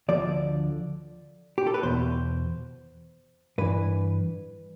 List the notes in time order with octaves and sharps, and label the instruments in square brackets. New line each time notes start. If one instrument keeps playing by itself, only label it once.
[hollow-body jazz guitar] D2 D3 F3 D5
G4
A4
B4
E2 B2 C5
G2 E3 B4